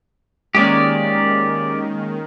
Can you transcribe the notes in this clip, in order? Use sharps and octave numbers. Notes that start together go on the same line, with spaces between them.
D#3 G#3 A#3 C#4 G4 D5